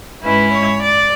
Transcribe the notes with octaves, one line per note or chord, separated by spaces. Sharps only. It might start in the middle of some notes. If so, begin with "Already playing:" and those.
G#2 G#3 C#4 E4 B4
C#5
D5